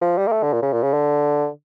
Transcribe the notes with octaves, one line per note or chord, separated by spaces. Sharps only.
F3
G3
A#3
A3
D3
A#2
C#3
A#2
C#3
D3